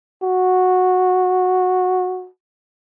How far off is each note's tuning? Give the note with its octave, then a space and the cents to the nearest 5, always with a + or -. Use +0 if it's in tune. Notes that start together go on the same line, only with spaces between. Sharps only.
F#4 -10